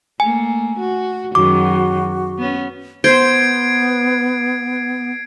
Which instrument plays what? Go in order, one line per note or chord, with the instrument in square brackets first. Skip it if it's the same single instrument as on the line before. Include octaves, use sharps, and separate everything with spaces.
[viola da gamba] A3 A#3 [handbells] G#5
[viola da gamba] F#4
[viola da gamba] F#2 D#3 G#3 [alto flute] F#4 [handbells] D6
[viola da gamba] B3 C#4
[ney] B3 [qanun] C5 [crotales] G#6 C7 D7